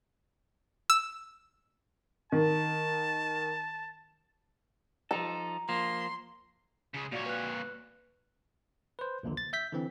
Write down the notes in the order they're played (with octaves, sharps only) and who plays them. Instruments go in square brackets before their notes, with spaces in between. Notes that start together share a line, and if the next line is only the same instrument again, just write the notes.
[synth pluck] E6
[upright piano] D#3 [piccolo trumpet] A5
[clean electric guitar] F3 D#4 A4 [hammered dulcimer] A#5
[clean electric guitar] F3 A#3 [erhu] C6
[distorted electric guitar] C#3 G#3
[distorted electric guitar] A#2 C#5 [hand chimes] F#4 D5 F5
[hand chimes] B4 F#6
[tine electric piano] B4 C5
A#1 D#2 A#2 D3
A6
E5 G6 B6
D3 E3 C4